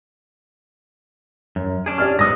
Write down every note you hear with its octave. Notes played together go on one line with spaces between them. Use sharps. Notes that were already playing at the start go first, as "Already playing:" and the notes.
F#2
C#4 D4 G#4
G4 D5 F6
G#2 G#3 B3 D#6 E6 A#6